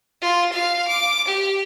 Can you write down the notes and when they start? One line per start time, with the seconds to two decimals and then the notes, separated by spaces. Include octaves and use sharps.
0.22 F4
0.53 F5
0.88 D6
1.28 G4